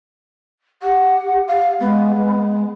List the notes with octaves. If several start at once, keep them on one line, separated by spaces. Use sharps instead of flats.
G4 F#5
F5
G#3 B3
G#3